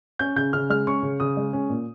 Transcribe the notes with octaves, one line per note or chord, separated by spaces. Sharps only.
C#4 G6
C#3 G6
C#3 F6
G#3 F6
C#4 C#6
C#3
C#3 D#6
G#3
C#4
A#2